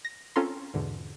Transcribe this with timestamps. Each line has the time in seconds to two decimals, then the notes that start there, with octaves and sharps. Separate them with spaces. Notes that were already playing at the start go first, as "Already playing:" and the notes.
0.05 A#6
0.36 C4 C#4 F4 A4 A#5 C6
0.74 E2 G#2 B2 D3